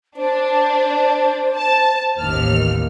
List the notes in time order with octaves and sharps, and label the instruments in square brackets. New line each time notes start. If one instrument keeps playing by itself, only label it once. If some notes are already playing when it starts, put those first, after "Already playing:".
[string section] D4 [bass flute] C5
[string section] A5
A1 D#2 F6